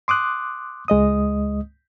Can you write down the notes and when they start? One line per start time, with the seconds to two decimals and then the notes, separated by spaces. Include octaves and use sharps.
0.08 C6 D6 D#6 F#6
0.88 C#2 G#3 D#5 D#6